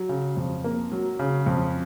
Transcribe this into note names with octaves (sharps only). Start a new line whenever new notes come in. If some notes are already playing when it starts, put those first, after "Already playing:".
Already playing: F#3
C#3
F2
A#3
F#3
C#3
F2